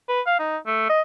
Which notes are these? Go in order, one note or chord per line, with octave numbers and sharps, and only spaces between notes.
B4
F5
D#4
A3
D#5